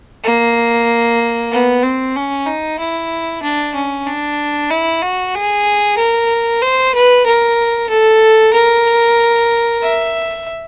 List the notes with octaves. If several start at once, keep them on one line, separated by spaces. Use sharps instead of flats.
A#3
B3
C4
C#4
D#4
E4
D4
C#4
D4
E4
F#4
G#4
A#4
C5
B4
A#4
A4
A#4
E5